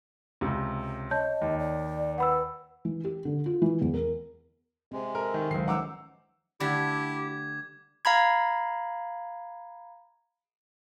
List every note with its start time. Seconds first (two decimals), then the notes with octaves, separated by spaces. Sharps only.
0.41 C#2 C3
1.11 C#5 D#5 A5 G6
1.41 D#2
1.59 D5
2.18 B4 F#5 B5 E6
2.85 E3
3.05 G4
3.25 D3
3.46 F4
3.62 E3
3.82 E2
3.94 A#4
4.92 C3 G#3 C4
5.15 A4 A#4
5.34 D#3
5.51 C#2 D#3 F#3 C5 C7
5.68 E3 F3 G#3 C#4 D#4 F#5 D6 E6
6.60 D3 G3 A3 E4 G4 D6 G#6
8.05 F5 A#5 B5 G#6